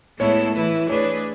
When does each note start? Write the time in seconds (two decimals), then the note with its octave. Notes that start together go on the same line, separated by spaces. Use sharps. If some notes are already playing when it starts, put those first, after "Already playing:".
0.19 A2 G#3 B3 E4 A4 C#5
0.54 E3 A3 E4 B4
0.89 A3 D4 G#4 B4 C#5